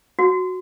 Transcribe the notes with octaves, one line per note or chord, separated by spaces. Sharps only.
F#4